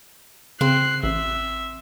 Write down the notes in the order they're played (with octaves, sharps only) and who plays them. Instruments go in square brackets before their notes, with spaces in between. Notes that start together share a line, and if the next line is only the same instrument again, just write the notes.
[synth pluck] C#3 [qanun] C4 [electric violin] F#6 C7
[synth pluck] A1 [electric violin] E5